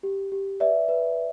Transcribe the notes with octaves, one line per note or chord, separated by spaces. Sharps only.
G4
G4
B4 D5 E5
B4